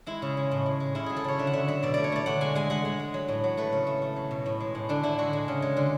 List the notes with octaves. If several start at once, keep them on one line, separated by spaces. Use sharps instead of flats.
G#3 E4
C#3
G#3
A2
G#3
G#3
C#3 E4
F#3 G#4
A4
C#3 C#5
D3 E5
F#5
D3 E5
F#3 E5
B2 D5
A3 D5
C#5
A3 D5
D3 F#5
G#3 G#5
G#3 G#5
G#3 F#5
G#3
G#3
F#3
A2
F#3
A3 B4
C#3
A3
A3
F#3
B2
A2
G#3
A2
D3 D4
D3 E4
G#3 F#4
G#3
C#3
G#3
D3